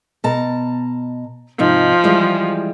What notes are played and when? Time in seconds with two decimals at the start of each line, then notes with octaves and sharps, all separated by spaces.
0.24 B2 A5 A#5
1.59 G#2 C3 F3 D#4
2.04 E3 G3 G#3